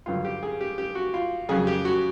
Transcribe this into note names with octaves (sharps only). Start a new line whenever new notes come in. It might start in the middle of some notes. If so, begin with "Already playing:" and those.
G2 D3 F#3 F4
G4
G#4
G4
G4
F#4
F4
F2 C#3 F#3 G#4
G4
F#4